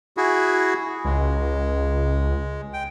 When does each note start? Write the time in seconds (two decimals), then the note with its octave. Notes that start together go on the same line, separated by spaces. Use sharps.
0.17 E4 F#4 G#4
1.05 C#2 G#3
2.73 G5